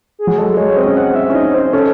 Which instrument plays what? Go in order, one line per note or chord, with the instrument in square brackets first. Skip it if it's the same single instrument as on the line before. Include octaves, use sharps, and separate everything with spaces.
[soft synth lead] G#4
[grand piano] F#3
[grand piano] G#3 [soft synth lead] A4
[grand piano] G#3 [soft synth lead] C#5
[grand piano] C4 [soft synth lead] D#5
[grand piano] C#4
[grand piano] C4 [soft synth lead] F#5
[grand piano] C#4 [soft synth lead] E5
[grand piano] C#4
[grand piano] D#4 [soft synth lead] D#5
[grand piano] C#4 [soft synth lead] C5
[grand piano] C#4 [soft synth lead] A4